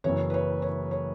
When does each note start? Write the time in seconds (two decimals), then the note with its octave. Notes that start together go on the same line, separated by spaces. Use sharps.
0.04 F#1 F#2 E3 C#5
0.30 B4
0.34 C#5
0.62 C#5
0.91 C#5